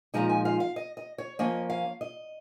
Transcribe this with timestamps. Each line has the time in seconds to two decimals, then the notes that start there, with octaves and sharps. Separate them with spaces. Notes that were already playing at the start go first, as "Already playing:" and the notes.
0.14 A#2 F3 G#3 D#4 A#5
0.29 G#5
0.45 F5
0.60 F5
0.76 D#5
0.97 D#5
1.18 C#5
1.39 F3 A#3 C#4 D#5
1.70 F5
2.01 D#5